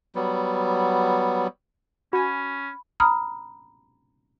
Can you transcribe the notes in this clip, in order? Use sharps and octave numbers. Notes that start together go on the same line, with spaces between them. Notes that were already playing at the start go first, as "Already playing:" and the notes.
F#3 G3 B3
C#4 F#4 G#5 B5
A#5 B5 D#6 F6